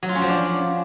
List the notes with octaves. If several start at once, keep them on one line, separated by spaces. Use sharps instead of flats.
F#3
F4
C#4
F3
D4